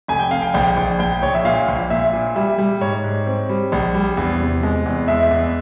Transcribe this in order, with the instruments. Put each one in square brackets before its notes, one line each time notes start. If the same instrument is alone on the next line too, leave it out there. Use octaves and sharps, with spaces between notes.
[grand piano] F1 G#5
G5
F1 F5
G5
A#1 G5
A#1
A#1 G5
A#1 C#5
E5
A#2 F5
A#1
A#2 E5
A#2
G3 E5
G3
G#2 C#5
G#2
C4
G3
A#1
G3
E2
C3
G#3
E2
G#3 E5
E2